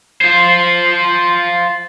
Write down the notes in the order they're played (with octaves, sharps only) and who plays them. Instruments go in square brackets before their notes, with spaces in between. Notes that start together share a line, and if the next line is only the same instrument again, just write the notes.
[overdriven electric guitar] F4 C5